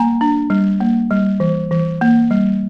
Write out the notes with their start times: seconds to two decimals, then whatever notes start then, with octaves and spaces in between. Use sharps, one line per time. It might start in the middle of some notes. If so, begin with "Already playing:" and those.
Already playing: G3 A#3 G#5 A#5
0.21 D4
0.50 G3
0.80 A#3
1.11 G3
1.40 E3
1.71 E3
2.01 A#3
2.31 G3